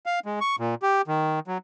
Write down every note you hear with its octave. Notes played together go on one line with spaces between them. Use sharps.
F5
G#3
C#6
A#2
G4
D#3
F#3